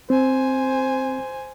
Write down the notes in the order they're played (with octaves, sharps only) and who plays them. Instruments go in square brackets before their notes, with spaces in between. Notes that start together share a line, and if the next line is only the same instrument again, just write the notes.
[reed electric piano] C4 [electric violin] C5 G#5